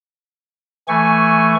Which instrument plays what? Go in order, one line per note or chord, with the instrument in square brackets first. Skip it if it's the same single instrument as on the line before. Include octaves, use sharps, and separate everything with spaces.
[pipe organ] E3 A3 C#6 [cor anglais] G#5